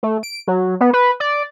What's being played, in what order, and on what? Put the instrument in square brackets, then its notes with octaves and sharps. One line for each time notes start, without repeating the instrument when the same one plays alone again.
[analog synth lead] A3
D7
F#3
B3
B4
D5